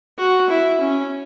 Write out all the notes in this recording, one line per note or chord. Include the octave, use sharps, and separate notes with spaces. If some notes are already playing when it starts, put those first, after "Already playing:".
F#4
E4
C#4